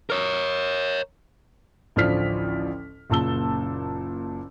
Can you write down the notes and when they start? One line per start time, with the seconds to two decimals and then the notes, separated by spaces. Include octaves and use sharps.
0.10 A#4 C#5
1.96 A1 D2 F3 D5 F6 B6
3.10 F#1 A#2 A5 E6 G7